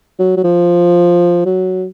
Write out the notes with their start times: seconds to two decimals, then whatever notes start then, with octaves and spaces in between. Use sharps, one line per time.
0.19 F#3
0.37 F#3
0.44 F3
1.46 F#3